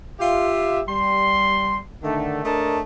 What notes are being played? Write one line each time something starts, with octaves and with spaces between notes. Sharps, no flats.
F4 G4 E5
G3 C6
D3 D#3 A3
A3 D4 A#4 C#5 D#5 A5